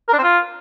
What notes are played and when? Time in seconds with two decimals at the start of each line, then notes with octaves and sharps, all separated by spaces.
0.08 A#4
0.13 D4
0.18 C4
0.23 F4